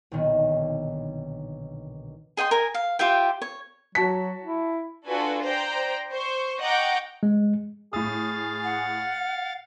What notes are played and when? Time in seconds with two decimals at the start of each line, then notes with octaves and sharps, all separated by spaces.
0.12 B1 A#2 D3 D#3 B3
2.37 G#4 D#5 G5 C6
2.51 A#4 G#5
2.74 F5
2.99 F4 G4 E5 G5
3.42 C#5
3.95 F#3 F#4 A5 B6
4.44 E4
5.07 D4 F4 F#4 A4 B4 G#5
5.43 C5 D5 G5 A#5
6.12 C5 C#6
6.61 D#5 F#5 G5 A#5 C#6 D6
7.23 G#3
7.93 A2 G#4 F5 D#6 A6
8.64 F#5